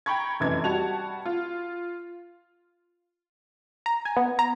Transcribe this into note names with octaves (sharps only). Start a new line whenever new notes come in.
G5 A#5 B5 C#6 G#6
F1 F#2 E3 D#4 G#6
G3 F#4 A5 F7
F4
A#5
G#5
B3
A#5